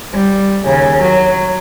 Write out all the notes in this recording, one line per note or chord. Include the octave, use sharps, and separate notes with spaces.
G3
D#2 C#3
F#3